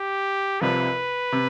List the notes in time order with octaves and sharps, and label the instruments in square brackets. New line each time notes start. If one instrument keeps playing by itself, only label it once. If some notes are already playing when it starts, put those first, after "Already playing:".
Already playing: [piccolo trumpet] G4
[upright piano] C2 C3 F3 [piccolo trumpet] B4
[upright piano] C3